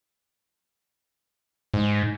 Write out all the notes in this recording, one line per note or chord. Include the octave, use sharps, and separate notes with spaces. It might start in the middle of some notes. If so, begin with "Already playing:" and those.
G#2